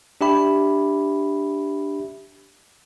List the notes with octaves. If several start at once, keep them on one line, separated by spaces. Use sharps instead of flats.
D4 G4 E5 B5